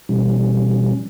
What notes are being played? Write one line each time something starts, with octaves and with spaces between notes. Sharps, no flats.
B2 E3 G3 C#4